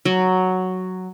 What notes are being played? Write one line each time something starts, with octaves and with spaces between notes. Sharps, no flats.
F#3